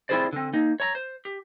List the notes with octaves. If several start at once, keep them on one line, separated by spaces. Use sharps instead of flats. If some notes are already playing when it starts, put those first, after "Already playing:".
C4 E4 F4 G#4 C5 D5
D3 C4
A#3 D#4
C#5 A#5
C5
G4